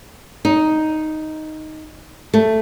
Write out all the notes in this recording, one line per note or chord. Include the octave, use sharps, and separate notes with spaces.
D#4
A3